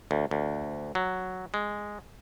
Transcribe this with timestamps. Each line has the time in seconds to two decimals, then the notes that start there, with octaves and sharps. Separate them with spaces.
0.11 D2
0.31 D2
0.95 F#3
1.54 G#3